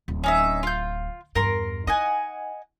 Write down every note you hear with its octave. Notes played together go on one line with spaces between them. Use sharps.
D1
C#4 D#4 E5
F4 G6
E2 G2 A#4 A#5 C6
D#4 D#5 F#5 G#5